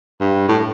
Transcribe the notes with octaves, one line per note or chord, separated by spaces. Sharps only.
G2
A2